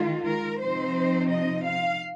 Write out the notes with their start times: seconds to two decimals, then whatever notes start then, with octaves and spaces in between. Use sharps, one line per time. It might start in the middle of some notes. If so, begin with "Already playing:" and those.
Already playing: D#3 G#3 F4
0.26 A#4
0.60 C3 F3 C4 D#4 C5
1.31 D#5
1.65 F5